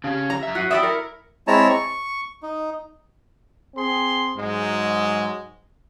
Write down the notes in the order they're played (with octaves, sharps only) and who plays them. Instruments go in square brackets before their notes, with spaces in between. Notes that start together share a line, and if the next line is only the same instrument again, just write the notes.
[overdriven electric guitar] C#3 C#4 [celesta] G4 F5 A5
[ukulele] A#5
[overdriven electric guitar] F#2 E5
[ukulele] F#4 [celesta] B6 C7 D#7
[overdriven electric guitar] E4 [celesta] F#4 D#6 [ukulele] G4 D5 E5
[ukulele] A#4 [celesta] A#6 C#7
[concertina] G#3 C4 E4 C#5 A5 A#5
C#6
D#4
[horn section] C4 G#4 C6
G#2 F#3 G#3